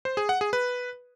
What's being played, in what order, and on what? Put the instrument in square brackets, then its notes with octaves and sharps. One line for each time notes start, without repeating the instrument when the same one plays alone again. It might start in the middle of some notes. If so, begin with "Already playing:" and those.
[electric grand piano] C5
G#4
F#5
G#4
B4